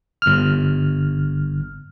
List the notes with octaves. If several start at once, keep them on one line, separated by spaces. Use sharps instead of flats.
G1 F6